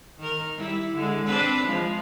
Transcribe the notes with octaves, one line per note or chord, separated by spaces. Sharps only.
D#3 A#4
G3 E4
D3 G#3
C4 D4 B4
F3 G#3